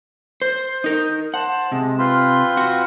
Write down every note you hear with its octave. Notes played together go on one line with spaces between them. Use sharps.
C5 G6
D#4 A#4
C5 F#5 A5
C3 G#3
C4 F4 B4 C6
F#4